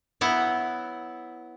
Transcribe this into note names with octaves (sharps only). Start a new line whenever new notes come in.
F#3 B3 E4 F#5